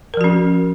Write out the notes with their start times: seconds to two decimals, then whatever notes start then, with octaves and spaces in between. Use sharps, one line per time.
0.14 A#4
0.17 F3
0.21 F#4
0.24 C#4